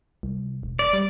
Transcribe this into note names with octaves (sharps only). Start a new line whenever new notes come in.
C2
E1
D5
G3